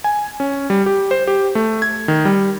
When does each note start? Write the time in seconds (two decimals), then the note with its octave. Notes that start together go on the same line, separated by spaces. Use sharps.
0.04 G#5
0.40 C#4
0.70 G3
0.86 G4
1.11 C5
1.27 G4
1.55 A3
1.82 G#6
2.08 D#3
2.25 G3